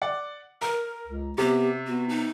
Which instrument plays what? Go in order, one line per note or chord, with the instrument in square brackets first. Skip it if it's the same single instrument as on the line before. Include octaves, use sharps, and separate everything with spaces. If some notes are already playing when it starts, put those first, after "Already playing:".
[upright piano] D5 F#5
[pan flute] A#4 [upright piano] A#5
[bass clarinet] C#2
[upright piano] C3 [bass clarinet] B3 [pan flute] G4
[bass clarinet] B3 [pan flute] F#4
[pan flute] D#4